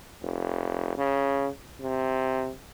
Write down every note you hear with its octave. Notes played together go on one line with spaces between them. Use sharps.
F1
C#3
C3